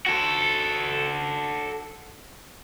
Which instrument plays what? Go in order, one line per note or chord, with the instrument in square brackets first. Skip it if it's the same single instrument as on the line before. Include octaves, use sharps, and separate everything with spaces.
[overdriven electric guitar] F#4 A4